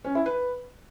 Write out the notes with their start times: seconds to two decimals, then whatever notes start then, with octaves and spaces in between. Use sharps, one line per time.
0.04 C#4
0.15 E4
0.26 B4